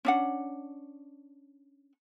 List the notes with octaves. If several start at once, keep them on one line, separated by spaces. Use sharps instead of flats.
C#4 D4 F#5